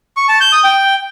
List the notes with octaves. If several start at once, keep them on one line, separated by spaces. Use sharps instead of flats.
C#6
A5
G6
D#6
G5